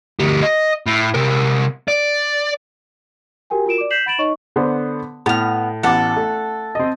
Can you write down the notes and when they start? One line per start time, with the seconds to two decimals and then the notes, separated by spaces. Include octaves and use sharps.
0.20 D2 G4
0.43 D#5
0.87 A2
1.14 C3 A#4
1.88 D5
3.50 F#4 G4 A#4 G5 G#5
3.66 F4 F#4 A#4 D7 E7
3.78 D5 D6
3.91 G6 B6 C7 E7 F#7
4.06 F#5 B5 A6 D7 E7 F#7
4.18 D#4 C#5 D#5 C#6
4.56 D3 B3 C5
5.26 A2 B3 F6
5.83 A1 B3 A4 F#5 D6
6.17 A3
6.75 C4 D#5